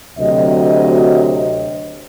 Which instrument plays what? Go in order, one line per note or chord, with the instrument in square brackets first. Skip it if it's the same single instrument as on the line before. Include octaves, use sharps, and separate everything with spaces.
[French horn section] D2 C3 F#3 D#5